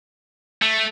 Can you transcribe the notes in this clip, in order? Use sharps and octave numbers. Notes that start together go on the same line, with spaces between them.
A3